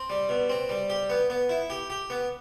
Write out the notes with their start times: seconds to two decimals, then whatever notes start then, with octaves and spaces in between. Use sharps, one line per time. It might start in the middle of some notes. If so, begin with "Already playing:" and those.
Already playing: C4
0.10 G3
0.29 B2
0.49 C4
0.69 G3
0.90 G4
1.10 B3
1.30 B3
1.49 E4
1.70 G4
1.90 G4
2.10 B3